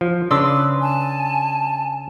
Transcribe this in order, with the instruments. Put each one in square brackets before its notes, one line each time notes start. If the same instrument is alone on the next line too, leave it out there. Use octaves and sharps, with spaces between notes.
[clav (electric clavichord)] F3
[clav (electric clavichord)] C#3 D4 [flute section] B4 [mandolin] C6 D6 E6
[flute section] G#5 A5